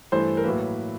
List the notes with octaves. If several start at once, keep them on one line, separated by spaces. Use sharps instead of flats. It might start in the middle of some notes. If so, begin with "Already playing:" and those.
G2 E3 A3 C5
A#4
A2 F#3 A#3 B4